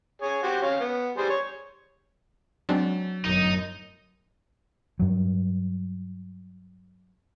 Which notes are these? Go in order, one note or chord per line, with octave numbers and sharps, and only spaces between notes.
G#4 C#5
F#4 G4 C5
C#4 F5
B3
G3 G#4 C5
C#5
F#3 G#3 C4 D4
G1 F#2 A2 D#4
G2 F#3